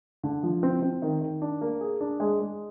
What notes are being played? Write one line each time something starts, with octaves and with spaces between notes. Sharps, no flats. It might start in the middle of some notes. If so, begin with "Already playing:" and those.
D3
F3
C4
C4
D#3
D#3
D4
A#3
G#4
D4
G#3
G#3